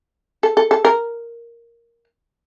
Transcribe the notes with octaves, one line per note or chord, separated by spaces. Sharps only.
A4
A4
A4
A#4